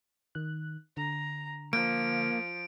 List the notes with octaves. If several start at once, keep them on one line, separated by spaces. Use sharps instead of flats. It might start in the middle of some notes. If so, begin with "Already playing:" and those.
D#3 F#6
D3 A#5
F3 A#3 D7